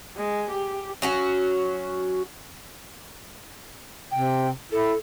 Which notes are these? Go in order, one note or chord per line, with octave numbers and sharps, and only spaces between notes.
G#3
G4
F#3 C#4 F#4
C3 G5
E4 A4